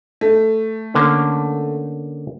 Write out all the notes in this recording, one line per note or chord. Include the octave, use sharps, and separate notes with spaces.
A3
D3 A#3 C#4